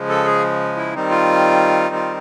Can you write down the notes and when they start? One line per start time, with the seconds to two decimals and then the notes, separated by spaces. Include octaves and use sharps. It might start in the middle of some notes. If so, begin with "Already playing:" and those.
Already playing: C#3 F3 G#3
0.09 A4
0.25 G#4
0.77 E4
0.94 D#3 G3 C4 D#4
1.10 F4
1.95 F4